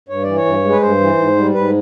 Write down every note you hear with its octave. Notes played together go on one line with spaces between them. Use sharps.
G2 C#5
E3 D5
C#5
G2
G#3
B4
G2 C5
E3
G#2
G3
G#2 B4